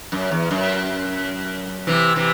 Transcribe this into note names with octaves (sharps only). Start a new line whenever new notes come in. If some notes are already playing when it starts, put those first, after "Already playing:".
F#2
E2
F#2
C3 E3
C3 E3